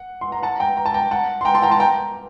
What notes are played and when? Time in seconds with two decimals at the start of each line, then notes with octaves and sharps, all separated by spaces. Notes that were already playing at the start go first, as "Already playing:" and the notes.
Already playing: F#5
0.21 C6
0.32 A#5
0.43 F#5 A5
0.60 G5 A#5
0.77 A#5
0.86 A5
0.94 G5 A#5
1.11 F#5 A5
1.41 C6
1.45 G5 A#5
1.54 A5 C6
1.62 G5 A#5
1.71 A5 C6
1.80 G5 A#5